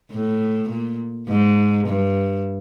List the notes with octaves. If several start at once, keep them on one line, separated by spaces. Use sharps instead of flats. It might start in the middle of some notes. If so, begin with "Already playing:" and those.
A2
A#2
G#2
G2